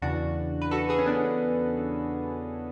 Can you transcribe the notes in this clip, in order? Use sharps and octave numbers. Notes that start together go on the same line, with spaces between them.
E2 C#3 E3 D4 F#4
B4
F#4 A4
G#4 B4
C#4
B3 D4